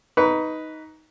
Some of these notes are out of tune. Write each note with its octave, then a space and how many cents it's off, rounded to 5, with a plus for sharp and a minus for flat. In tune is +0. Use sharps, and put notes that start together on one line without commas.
D#4 +10 B4 +0 C#6 +35